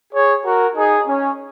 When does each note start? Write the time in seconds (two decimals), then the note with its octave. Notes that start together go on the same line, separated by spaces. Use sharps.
0.13 G#4 C#5
0.45 F#4 A#4
0.76 D#4 G#4
1.08 C#4